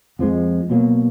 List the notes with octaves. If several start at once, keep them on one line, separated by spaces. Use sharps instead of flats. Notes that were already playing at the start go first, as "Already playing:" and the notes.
F2 F3 G#3
B2 F#3 A#3